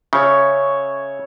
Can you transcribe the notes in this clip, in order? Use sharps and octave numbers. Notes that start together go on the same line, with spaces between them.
C#3 C#5 E5